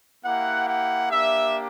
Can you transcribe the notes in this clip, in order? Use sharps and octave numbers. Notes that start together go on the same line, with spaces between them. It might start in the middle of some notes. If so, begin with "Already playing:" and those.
A#3 E4 G4 F#5
F#5
A#3 D4 G4 E5